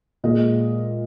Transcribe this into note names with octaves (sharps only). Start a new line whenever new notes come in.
A#2 G#3 D#5